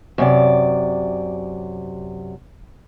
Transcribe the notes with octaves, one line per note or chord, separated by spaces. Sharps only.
F#2 C3 D5